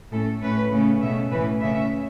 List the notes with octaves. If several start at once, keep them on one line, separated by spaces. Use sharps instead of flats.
A2 A3 C#4 A4
A2 A3 C#4 B4
C#3 A3 C#4
B2 A3 C#4 E5
A2 E3 C#4 B4
C#3 A3 C#4 E5